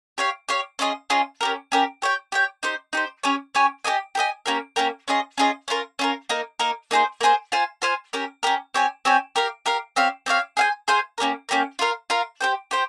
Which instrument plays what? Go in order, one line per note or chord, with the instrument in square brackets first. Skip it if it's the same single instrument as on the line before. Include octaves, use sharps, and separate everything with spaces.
[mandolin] G4 C#5 F5
G4 C#5 F5
C#4 F4 G#4 D#5
C#4 F4 G#4 D#5
C#4 G4 A#4
C#4 G4 A#4
G4 C#5 G5
G4 C#5 G5
D#4 G4 C5
D#4 G4 C5
C#4 G4 C#5 G#5
C#4 G4 C#5 G#5
G4 A#4 D#5 G#5
G4 A#4 D#5 G#5
A#3 C#4 G4 A#4
A#3 C#4 G4 A#4
C#4 F4 G#4 D#5
C#4 F4 G#4 D#5
C#4 F4 A#4
C#4 F4 A#4
A#3 D#4 A#4
A#3 D#4 A#4
A#3 D#4 G#4 C5
A#3 D#4 G#4 C5
F4 C5 F5 G#5
F4 C5 F5 G#5
C#4 G4 A#4
C#4 G4 A#4
C4 G4 C#5 G#5
C4 G4 C#5 G#5
G4 A#4 F5
G4 A#4 F5
C4 G4 C#5 F5
C4 G4 C#5 F5
G#4 C5 F5 G#5
G#4 C5 F5 G#5
A#3 C#4 G4 A#4
A#3 C#4 G4 A#4
F4 A#4 F5
F4 A#4 F5
G4 C5 G5
G4 C5 G5